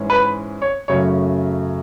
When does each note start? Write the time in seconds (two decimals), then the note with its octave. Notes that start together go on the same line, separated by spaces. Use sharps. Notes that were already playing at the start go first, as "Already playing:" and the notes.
Already playing: G#2 E3 G#3 C#4
0.10 B4
0.62 C#5
0.88 F#2 C#3 F#3 A3 C#5